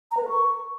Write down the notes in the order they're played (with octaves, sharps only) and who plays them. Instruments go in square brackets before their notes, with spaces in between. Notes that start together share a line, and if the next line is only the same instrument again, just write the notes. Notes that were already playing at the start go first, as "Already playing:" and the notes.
[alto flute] A#5
B4
A#4
C#6